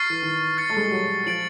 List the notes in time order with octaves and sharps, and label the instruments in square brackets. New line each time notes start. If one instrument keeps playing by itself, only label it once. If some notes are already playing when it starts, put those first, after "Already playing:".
Already playing: [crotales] C#6 F6 A6 C7
[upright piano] E3
D#3
[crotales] F6 A6 C#7
[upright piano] A3
G#3
G3
F#3
[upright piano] F3 [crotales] A6 D7 F#7